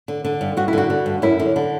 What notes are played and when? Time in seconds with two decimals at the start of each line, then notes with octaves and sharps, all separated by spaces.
0.08 D3
0.25 D3
0.41 G2
0.57 G2 F#4
0.68 E4
0.73 D3 F#4
0.90 D3
1.06 G2
1.22 F#2 E4
1.40 D3
1.56 D3